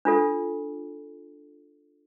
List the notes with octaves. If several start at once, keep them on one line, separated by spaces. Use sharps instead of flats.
D4 F4 A4